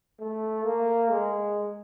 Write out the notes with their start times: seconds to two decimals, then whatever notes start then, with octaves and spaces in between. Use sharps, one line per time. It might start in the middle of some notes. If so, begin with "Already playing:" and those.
0.20 A3
0.65 A#3
1.11 G#3